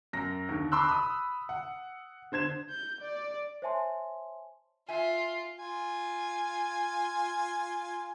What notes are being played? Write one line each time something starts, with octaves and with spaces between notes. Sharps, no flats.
F#2 A#6
D#2 D3
A5 B5 C6 D6 E6 F#6
B5 D#6
F#5
D3 C5 G#6 E7
G6
D5
C5 C#5 E5 G#5 A5 C6
F4 E5 G#5
F4 G#5